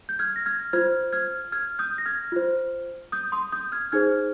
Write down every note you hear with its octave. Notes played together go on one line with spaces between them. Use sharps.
G6
F6 G#6
A#6
F6 G#6
F4 C5 F6 G#6
F6 G#6
F6 G#6
D#6 G6
A#6
F6 G#6
F4 C5
D#6 G6
C6 D#6
D#6 G6
F6 G#6
D#4 G#4 C5 F6 G#6